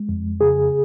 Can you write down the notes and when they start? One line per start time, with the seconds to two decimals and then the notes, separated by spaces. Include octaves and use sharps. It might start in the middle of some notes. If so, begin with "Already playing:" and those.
Already playing: G#3
0.09 F2
0.41 C#3 G#4